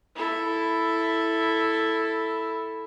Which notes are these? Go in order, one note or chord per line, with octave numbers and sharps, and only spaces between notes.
E4 A4